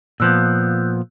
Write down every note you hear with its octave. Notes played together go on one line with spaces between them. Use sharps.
A#2 F3 B3 E6 F#6 G6